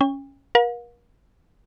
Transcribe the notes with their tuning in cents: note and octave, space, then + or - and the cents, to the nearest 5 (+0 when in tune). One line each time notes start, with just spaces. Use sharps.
C#4 +0 G5 +45
A#4 +40 F5 +40